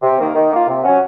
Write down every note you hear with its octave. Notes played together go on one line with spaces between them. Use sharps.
C3
D#3 A#3
D#3
A#3 F4
C3
F#3 C#4 F#4